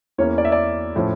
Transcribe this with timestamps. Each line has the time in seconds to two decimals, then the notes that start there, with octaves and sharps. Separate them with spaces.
0.18 E2 E3 A#3 C#4 C#5
0.38 D5
0.45 E5
0.52 D5
0.96 A2 F3 C#4